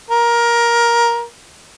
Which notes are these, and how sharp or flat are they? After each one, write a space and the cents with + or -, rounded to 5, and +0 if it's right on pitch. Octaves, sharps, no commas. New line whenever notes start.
A#4 +15